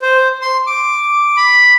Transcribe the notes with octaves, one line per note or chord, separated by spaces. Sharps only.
C5
C6
D6
B5